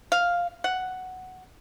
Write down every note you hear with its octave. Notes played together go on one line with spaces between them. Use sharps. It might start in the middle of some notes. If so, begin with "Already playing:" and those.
F5
F#5